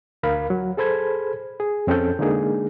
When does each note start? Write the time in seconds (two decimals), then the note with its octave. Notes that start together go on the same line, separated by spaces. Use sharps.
0.23 D2 A#4 F5 B5
0.50 F#3
0.77 G#4 A4 C5 B5 G#6
1.60 G#4
1.87 F2 C4 C#4 A4 G6
2.19 D3 G#3 A#3 D#4 G#4